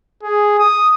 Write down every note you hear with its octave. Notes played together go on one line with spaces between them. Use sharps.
G#4
D#6